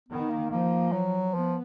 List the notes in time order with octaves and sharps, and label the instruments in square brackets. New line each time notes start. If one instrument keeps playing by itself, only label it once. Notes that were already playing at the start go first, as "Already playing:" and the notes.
[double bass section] D#3 [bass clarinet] B3
[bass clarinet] A#3
[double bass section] F3 [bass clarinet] A#3
[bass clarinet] F#3
[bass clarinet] F3 [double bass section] B3